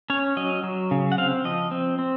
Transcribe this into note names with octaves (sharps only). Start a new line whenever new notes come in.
C#4 C#5
F#3 D#5
F#3
C#3
F#5
C4 F5
F3 D#5
C4
C4